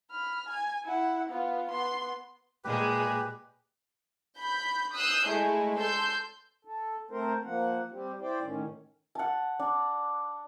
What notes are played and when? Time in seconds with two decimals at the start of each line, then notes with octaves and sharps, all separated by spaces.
0.11 B5 F6
0.48 G#5
0.85 E4 F#5
1.29 B3 F4
1.71 B3 C6
2.64 A#2 G#3 G4 G#4 B4
4.37 B5 G6
4.94 D#6 E6 F#6 G6 C7
5.27 G#3 A3 E4
5.76 A4 C6 E6 G6
6.65 A4
7.11 A3 C4 A#4 C5
7.44 F3 A#3 F#5
7.92 G3 C4 G4
8.21 E4 C5 D5 G5
8.43 A2 D#3 C#4
9.15 F#5 A5
9.59 D4